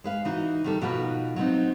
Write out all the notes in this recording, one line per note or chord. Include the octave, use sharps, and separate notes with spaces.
G#3 B4 F5
E3 D#4 F#4
D#3 G3 A4
B2 F3 D#4 F#4 A4 B4
F#3 B3 C4 D#4